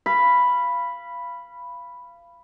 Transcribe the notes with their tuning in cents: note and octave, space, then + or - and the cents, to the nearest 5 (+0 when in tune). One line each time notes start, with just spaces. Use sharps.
F5 -25 B5 +0